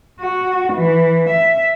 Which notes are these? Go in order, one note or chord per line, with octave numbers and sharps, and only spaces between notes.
F#4
E3
E5